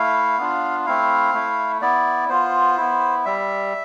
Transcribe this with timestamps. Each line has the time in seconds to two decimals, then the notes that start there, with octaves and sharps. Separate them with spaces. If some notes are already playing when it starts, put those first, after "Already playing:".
Already playing: A3 E4 F5
0.38 B3 D4 F4
0.86 A3 C4 E4 F5
1.34 A3 E4
1.81 B3 E4 D5
2.29 B3 F4 C5
2.77 B3 E4
3.25 G3 E5